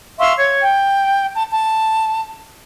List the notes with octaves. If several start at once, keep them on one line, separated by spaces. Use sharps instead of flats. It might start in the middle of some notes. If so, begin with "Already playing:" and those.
E5 F5 C6 C#6
C#5
G5
A5
A5